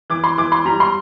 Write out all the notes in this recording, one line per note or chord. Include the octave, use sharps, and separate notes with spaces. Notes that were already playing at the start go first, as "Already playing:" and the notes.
E3 D6
C6
E3 D6
C6
G3 A#5
C6